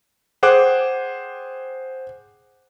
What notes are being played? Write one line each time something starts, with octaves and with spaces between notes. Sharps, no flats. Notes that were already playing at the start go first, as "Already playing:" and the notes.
G#4 C5 F#5 G5 D6 F#6